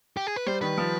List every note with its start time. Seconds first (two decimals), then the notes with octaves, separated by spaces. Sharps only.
0.17 G4
0.27 G#4
0.36 B4
0.46 G3 C5
0.61 D#3 B4
0.77 F3